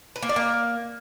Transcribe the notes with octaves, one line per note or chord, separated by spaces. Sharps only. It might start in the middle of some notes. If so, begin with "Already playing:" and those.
B4
A#3
D5
A#3